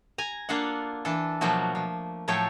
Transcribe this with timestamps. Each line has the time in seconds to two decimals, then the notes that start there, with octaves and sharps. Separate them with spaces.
0.18 G#5 A#5
0.49 A#3 D4 F4 A4 F5 F#5
1.05 E3 D4 A4
1.41 B2 F3 F#3 A3 A#3 F#4
1.75 F3
2.28 A2 F3 F#3 A4 C#5 G5